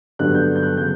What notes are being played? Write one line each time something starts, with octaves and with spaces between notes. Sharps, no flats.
G2 D3 F#3 B3 F#6
G6
G6
F#6
C#3 F#3 B3 G6